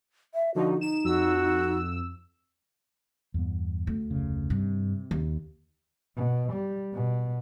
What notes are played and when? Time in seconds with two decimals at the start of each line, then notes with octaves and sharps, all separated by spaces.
0.34 E5
0.55 D3 F3 D#4 F#4
0.81 D#4 E7
1.04 F2 F#4 E6
3.34 E2 G2 B3
3.87 D2
4.11 F1 C#3
4.50 G2 C3
5.11 D#2
6.17 B2
6.52 G3
6.94 B2